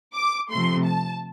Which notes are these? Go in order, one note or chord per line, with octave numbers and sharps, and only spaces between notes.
D6
C3 F3 A3 C6
A5